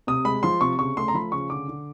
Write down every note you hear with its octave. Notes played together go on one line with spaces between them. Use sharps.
C3 D#6
G#3 B5
F3 C6
C3 C#6
C#3 C#6
A3 C6
A#5
F3 B5
C#3 C#6
D3 D6
D3